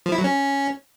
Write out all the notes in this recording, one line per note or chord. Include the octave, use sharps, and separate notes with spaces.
F3
E4
F#3
C#4